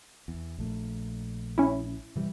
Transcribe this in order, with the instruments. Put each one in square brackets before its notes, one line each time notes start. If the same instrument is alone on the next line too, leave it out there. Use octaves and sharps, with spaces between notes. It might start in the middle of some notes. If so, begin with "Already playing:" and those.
[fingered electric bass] E2
A#1 A3
[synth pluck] C#4 E4
[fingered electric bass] C3 E3 G3